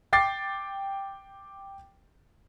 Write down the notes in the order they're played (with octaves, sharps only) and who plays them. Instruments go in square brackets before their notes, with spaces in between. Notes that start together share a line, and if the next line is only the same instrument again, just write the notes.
[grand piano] G5 D6 A6 C7